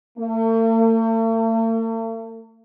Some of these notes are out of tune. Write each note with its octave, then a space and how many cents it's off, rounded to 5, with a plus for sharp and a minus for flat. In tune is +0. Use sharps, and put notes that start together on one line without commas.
A3 +45